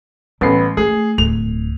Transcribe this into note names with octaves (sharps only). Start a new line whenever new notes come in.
A1 G3 B3 C7
A3 G#4
D1 F7